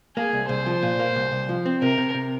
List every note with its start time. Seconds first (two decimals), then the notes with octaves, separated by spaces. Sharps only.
0.17 A#3 G#4
0.33 C2
0.49 C2 C5
0.66 F3
0.83 A#2
0.99 A#3
1.16 C2
1.32 C2
1.49 F3
1.66 C4
1.82 C3 A#4
1.98 C3
2.15 C3